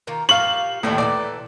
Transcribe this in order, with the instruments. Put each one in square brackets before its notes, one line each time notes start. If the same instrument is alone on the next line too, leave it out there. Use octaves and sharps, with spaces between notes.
[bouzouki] D#3 A#3 F4
[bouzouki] A#2 F4 G4 [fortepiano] F5 C#6 [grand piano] F#7
[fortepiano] D#2 A2 [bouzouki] E3 A3 D5
[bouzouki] A#2 E3 A4 [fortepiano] D5